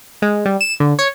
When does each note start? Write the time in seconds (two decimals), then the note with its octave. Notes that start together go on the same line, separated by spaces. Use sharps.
0.22 G#3
0.46 G3
0.61 E7
0.80 D3
0.99 C#5